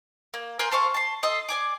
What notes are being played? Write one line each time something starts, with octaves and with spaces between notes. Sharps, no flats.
A#3
A#4 G#5 C6 G6
A4 C5 F5 C#6
A5 C6
A4 D#5 C6
D5 G#5 D6